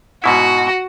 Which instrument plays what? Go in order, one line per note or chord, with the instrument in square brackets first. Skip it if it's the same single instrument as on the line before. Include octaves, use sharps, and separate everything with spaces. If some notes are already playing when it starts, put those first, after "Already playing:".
[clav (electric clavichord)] G#2 B2 E4 [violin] F#4